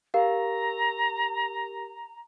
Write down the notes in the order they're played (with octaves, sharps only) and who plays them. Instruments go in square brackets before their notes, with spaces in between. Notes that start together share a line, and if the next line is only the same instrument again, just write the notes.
[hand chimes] G4 A#4 [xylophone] F5 [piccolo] A#5